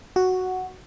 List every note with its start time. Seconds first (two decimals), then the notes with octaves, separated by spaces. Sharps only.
0.16 F#4